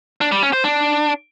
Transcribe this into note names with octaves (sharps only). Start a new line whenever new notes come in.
D4
G3
C#4
C5
D4